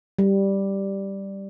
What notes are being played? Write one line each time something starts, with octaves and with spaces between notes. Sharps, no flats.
G3